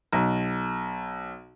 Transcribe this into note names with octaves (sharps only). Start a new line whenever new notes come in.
B1